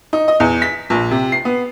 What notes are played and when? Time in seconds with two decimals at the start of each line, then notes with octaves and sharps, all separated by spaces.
0.13 D#4
0.28 D#5
0.40 E2
0.62 B6
0.90 A#1
1.11 C3
1.32 C7
1.45 B3